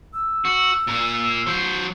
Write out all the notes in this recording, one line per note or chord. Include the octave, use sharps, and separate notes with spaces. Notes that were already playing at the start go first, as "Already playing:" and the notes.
E6
F#4
A#2 A#4
F#3 C5